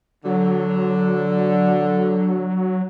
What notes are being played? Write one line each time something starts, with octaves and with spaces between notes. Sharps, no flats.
D3 F#3